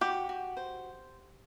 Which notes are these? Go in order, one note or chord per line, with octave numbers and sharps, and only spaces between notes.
F#4 G4
F#4
C5